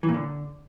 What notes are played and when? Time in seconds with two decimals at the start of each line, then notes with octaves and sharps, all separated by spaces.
0.03 E3
0.09 A#2
0.14 D3